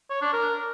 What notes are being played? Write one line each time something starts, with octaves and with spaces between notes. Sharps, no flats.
C#5
D4
A#4